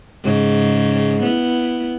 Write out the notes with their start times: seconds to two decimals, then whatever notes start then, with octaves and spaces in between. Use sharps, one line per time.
0.23 G#2 C#3
1.23 B3 E4